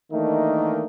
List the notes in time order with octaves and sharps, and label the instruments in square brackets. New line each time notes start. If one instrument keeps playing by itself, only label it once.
[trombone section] D#3 E3 A3 A#3 D4 D#4